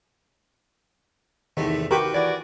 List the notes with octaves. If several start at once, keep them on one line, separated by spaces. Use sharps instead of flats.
E2 C3 D#3 A3
F#4 G4 A#4 B4 G5
E3 F#4 D5 G#5